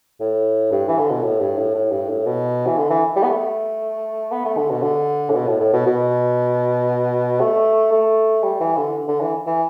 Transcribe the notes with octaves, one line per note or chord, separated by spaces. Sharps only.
A2
G2
E3
D3
B2
A2
G2
A2
A2
G2
A2
B2
E3
D3
E3
G3
B3
A3
B3
A3
D3
B2
D3
A2
B2
A2
A2
B2
B2
A3
A3
G3
E3
D3
D3
E3
E3